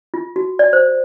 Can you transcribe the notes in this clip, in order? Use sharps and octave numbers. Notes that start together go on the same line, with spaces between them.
F4
F#4
D5
C5